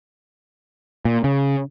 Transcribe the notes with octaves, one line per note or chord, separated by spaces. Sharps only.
A#2
C#3